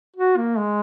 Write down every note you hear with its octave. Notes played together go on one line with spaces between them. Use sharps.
F#4
A#3
G#3